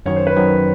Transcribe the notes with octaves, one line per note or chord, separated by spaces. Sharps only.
F#2 D#3 F#3 C#5
C5
B4
F#2 D#3 F#3